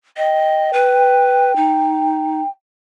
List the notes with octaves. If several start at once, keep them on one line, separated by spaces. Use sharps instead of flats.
D#5 G5
B4
D#4